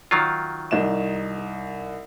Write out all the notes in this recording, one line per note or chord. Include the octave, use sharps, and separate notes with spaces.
D#3 F#3 F4
C2 D#4 E7